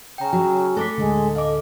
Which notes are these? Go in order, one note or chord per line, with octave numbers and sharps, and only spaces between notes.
C#3 G5 A#5
F#3
A3 A4 D6 B6
D1 G#1 D3 G#3
D#5 F5 D6